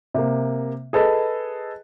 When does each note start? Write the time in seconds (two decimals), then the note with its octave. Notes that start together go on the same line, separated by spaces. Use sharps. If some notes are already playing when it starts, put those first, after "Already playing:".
0.14 C3 A#3
0.93 G#4 A4 B4 D#5